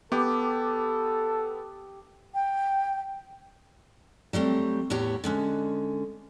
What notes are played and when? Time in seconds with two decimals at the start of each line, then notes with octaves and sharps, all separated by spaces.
0.12 B3 G4 A4 D6
2.34 G5
4.33 F#3 G3 A3 C4
4.90 E2 A2 B3 G4 C#5
5.24 D3 G#3 C#4